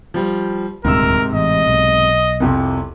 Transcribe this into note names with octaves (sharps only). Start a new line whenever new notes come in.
F3 G3
D#1 D2 G#2 C3 A#4 E6
A1 D#5
B1
C2 F2 C3